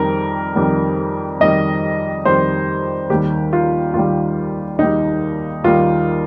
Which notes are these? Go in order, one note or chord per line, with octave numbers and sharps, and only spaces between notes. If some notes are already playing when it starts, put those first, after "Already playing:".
Already playing: F2 D#3 G3 A#4
F2 D#3 G3
F2 D#3 G3 D#5
F2 D#3 G3 C5
D#2 D#3 G3 G4
F4
D#2 D#3 G3 F4
D#2 D#3 G3 D#4
D#2 D#3 G3 F4